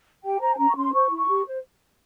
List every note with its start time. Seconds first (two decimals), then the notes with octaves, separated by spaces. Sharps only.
0.24 G4 G5
0.41 C5 A#5
0.54 G#5
0.58 C#4 A#5
0.69 C#6
0.76 C#4 C6
0.93 C5 C#6
1.10 E4
1.17 C#6
1.28 G4
1.46 C5